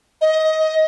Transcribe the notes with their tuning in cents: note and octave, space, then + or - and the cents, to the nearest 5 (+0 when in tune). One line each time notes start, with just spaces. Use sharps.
D#5 +20